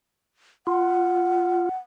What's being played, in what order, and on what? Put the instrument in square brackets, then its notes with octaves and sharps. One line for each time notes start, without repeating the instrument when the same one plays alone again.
[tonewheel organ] F4 [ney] F#5